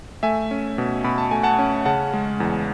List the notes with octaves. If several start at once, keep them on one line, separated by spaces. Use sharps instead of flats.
A3 E5 G#5
C#4
B2
B2 B5
A5
A3 G#5
F#5 A5
C#4
C#3 F#5 A5
G#3
E2